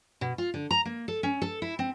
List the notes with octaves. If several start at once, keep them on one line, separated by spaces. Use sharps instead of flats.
B2
F4
D3
A#5
A#3
A4
C#4
A4
E4
C4